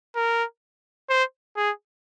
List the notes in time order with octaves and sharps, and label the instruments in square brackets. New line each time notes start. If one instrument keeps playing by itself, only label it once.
[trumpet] A#4
C5
G#4